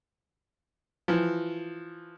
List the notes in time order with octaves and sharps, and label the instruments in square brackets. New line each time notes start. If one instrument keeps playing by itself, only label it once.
[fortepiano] E3 F3